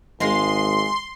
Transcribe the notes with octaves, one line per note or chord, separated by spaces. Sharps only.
G#1 G#3 D#5 F5 C6